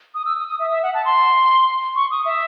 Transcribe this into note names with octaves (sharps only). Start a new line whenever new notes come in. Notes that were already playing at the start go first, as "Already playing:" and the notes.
D#6
E6
D#6
D#6
E5
E5
F#5
A5
C6
C#6
D#6
E5